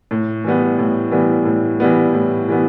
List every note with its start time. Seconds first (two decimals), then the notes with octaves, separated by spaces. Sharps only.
0.11 A2
0.44 E3 G3 B3
0.79 A2
1.11 E3 G3 B3
1.45 A2
1.80 E3 G3 B3
2.13 A2
2.48 E3 G3 B3